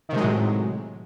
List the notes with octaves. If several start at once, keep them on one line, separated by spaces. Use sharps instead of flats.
A2 C3 D#3 F#3 G#3